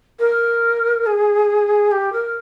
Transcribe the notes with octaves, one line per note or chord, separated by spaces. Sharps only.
A#4
G#4
G4
A#4